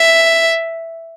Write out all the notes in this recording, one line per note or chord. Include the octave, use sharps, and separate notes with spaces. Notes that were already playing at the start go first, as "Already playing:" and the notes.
Already playing: E5